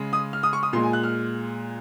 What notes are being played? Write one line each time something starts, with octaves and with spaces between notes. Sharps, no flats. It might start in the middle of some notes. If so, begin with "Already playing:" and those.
Already playing: C#3 G#3
D#6
F6
D#6
C#6
D#6
A#2 G#3 C6
G#5
F#6
F6